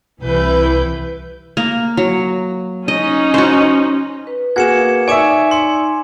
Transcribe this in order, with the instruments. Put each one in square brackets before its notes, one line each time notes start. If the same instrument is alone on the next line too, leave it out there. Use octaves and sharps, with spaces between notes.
[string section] C2 E3 E4 B4 G6
[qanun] A#3
F#3
[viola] C#4 D#4 [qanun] D#5
[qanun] F#4 C5
[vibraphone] B4
[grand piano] A#3 F#4 G#4 [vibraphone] B4 [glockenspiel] G#6 C#7 E7
[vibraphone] D#4 D5 E6 [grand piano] C#5 E5 [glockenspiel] G#5 D6 E7
[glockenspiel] C6 [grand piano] C#7